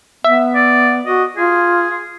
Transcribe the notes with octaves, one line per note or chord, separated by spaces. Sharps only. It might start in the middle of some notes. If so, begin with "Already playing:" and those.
B3 E5
D5
F#4 D#5
F4 G#4